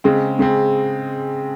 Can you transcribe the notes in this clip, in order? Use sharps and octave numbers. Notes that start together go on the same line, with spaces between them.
C#3 G#3 C4
C#3 G#3 C4